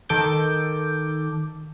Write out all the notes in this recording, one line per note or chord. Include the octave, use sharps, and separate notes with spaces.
D#3 A4 D6 G6